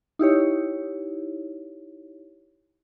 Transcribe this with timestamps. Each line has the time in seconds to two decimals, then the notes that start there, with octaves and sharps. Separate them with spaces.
0.19 D#4 E4 G4 C#5